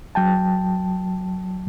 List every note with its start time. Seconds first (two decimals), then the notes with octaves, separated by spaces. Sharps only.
0.15 F#3 G5 A5